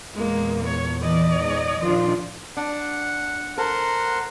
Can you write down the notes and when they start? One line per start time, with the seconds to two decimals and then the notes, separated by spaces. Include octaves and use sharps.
0.13 E2 A#2 G#3 A#3
0.67 C#5
1.02 E3 D5 D#5
1.40 G#2
1.79 A#2 D#3 F3 D4 F4
2.57 D4 F#5
3.58 A4 A#4 C5 F#5